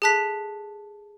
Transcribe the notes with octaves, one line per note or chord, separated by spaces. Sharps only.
G#4 A4 A5 F#6 B6 F7